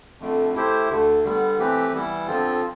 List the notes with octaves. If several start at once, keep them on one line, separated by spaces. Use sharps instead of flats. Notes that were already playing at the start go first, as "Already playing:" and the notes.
F2 D3 A3
A3 E4 G4 C5
D2 D3 A3
D3 G3 B3
E3 A3 C4 G4 B4
E3 G3 B3 E4
F2 D3 F3 C4 F4